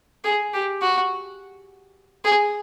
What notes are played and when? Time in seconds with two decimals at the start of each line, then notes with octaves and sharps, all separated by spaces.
0.24 G#4
0.54 G4
0.82 F#4
2.25 G#4